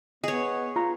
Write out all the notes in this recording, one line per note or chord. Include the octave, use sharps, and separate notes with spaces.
B3 G#4 C#5 D#5
F4 A#5